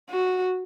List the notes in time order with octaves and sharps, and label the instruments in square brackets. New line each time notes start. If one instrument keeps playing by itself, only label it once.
[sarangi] F#4